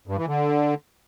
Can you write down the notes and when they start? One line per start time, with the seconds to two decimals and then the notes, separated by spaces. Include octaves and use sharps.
0.07 G2
0.17 E3
0.27 D3